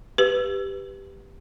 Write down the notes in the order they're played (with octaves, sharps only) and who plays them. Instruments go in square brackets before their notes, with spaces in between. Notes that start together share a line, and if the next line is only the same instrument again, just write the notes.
[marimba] G4 B4